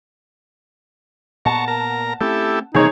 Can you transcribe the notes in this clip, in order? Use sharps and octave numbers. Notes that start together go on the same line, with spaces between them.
A#2 B3 F#5 A5 A#5 C#6
A#4 A#5
A3 C4 C#4 E4 G4 A4
C3 E3 F3 G3 A#3 D#4 G#4 C#5